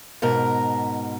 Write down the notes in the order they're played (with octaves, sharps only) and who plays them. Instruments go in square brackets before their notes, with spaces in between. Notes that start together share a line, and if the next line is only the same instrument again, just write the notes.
[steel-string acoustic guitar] G#2 B2 A#4